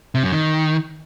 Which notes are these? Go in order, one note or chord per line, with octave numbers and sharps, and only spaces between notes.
C3
F#2
D#3